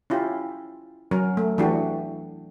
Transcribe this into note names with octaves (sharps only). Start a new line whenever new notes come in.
C#4 E4 F4 G4
F#3 C#4 A#4
A3
E3 A3 D4 F#4 G4